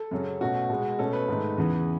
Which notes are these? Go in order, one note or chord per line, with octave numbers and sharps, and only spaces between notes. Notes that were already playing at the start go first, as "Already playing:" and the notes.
Already playing: A4
F#2 C#3 F#3 C#4
B2 A3 C#4 F#4
B2 G#3 B3
B2 A3 C#4 A4
B4
G#2 D#3 A3
E2 C#3 E3 B3